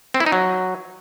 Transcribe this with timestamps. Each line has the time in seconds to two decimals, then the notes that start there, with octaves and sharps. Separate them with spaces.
0.14 C4
0.20 E4
0.26 D#4
0.32 F#3